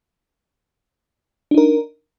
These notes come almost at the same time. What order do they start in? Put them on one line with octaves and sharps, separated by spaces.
D4 D#4 A#4